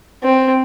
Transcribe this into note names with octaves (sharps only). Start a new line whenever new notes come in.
C4